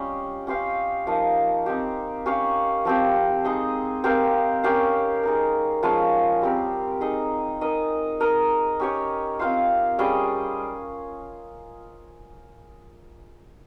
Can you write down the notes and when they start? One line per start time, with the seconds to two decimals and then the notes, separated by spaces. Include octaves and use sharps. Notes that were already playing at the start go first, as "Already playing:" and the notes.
Already playing: G3 C#4 F4 G4 D#5
0.47 C#4 G4 C5 F5
1.07 F3 A#3 D#4
1.66 C4 D#4 G4
2.26 C#4 G4 C#5 F5
2.85 F3 C4 G4
3.44 G#3 D#4 G#4 D#5
4.04 C4 G4 A#4 F5
4.63 C#4 G4 A#4 F5
5.23 G#3 D#4 A#4
5.83 F3 G#3 C#4 F4
6.42 G3 C4 G4 A#4
7.01 D#4 G#4 D#5
7.61 D#4 A#4 D#5
8.20 D#4 A#4 D#5
8.80 C#4 G4 C#5
9.39 C4 F4 C5 F5
9.99 G3 C#4 G#4 D#5